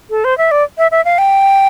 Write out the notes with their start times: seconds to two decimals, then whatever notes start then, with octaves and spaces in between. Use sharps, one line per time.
0.10 A4
0.24 C5
0.38 E5
0.51 D5
0.78 E5
0.91 E5
1.05 F5
1.18 G5